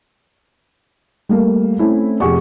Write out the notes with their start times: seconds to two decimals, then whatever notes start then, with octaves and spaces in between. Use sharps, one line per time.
1.29 G3 A3 A#3
1.79 A3 C4 C#4 E4
2.20 F1 G4 G#4 F#5 C#6